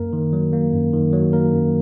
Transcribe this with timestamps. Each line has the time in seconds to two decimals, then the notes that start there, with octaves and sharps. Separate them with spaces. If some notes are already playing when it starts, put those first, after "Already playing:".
Already playing: F#2 A#3 A#4
0.13 D#3
0.33 F#3
0.53 A#3
0.73 F#2
0.93 D#3
1.13 F#3
1.33 A#3 A#4
1.53 F#2